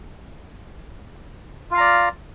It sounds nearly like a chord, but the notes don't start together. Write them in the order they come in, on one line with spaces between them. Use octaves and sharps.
F4 F5 A#5 D5